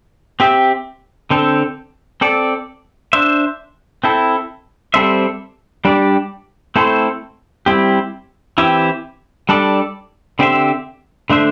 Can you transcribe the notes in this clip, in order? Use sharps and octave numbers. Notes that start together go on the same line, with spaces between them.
C4 G4 E5
D3 C4 A4
C4 A4 D5
D4 C5 E5
C4 E4 A4
G3 C4 A4 C5 E5
G3 D4 G4 D5
A3 C4 E4 A4 C5
G3 C4 E4 G4
E3 C4 E4 G4 E5
G3 D4 A4 D5
D3 C4 G4 C5 E5
D3 A3 D4 C5 E5